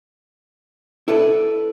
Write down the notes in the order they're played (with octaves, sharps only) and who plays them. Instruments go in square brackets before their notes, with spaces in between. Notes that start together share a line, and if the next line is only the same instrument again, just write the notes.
[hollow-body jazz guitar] E4 A4 B4 D5